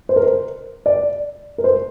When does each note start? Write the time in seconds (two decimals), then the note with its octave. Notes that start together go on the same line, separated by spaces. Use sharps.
0.09 C5
0.16 A#4
0.23 C5
0.86 D5
1.58 A#4
1.64 C5